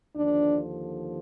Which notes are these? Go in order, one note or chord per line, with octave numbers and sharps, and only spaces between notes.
D#2 D3 F3 D4